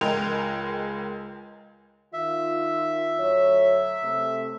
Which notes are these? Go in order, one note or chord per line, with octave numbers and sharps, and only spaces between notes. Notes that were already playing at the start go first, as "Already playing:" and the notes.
C#2 G#3 A#4 G5 F7
D#3 F4 E5
D2 F#3 C#5
C3 A3